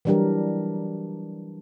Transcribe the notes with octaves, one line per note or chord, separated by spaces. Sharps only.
E3 F#3 G3 D4 G4 A#4